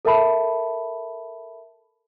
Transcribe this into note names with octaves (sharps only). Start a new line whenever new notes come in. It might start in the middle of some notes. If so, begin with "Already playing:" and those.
A4 A#4 E5 A5 B5